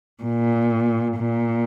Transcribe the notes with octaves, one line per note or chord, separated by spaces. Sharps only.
A#2
A#2